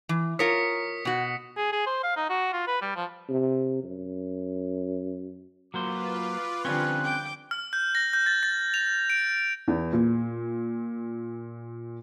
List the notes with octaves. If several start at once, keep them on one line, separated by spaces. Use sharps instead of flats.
E3
F4 A#4 C#5 D#6 B6 C#7
B2 F#4
G#4
G#4
C5
F5
D#4
F#4
F4
B4
G3
F3
C3
F#2
F#3 A#3 F4 B4 C5 D6
D3 F3 G3 C4 C#4 C#5 F#6
G5 D6 G6
F6
G6
A#6
G6
A6
A6
F7
D7
E2
A#2